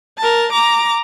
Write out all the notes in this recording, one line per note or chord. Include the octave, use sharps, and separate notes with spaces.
A#4 A5
A#5 D6